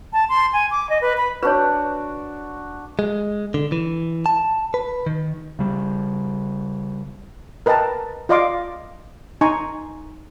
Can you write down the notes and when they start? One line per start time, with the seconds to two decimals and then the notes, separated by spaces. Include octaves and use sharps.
0.13 A5
0.29 C6
0.53 G#5
0.71 D6
0.89 D#5
1.01 B4
1.17 B5
1.43 D4 F#4 B4 C#5
2.99 G#3
3.54 D3
3.72 E3
4.26 A5
4.74 B4
5.06 D#3
5.59 C#3 G3
7.66 A#4 B4 D#5 G5 A5 A#5
8.29 F4 D5 D#5 F5 C6 D6
9.41 D#4 G#5 A#5 C6 C#6